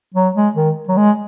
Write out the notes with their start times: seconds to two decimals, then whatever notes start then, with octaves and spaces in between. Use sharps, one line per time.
0.14 F#3
0.35 G#3
0.56 D#3
0.88 F#3
0.97 G#3